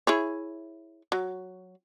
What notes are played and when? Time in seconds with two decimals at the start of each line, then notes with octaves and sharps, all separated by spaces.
0.07 E4 G#4 C#5
1.12 F#3